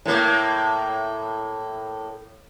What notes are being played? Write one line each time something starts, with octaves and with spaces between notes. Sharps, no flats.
A2 A#3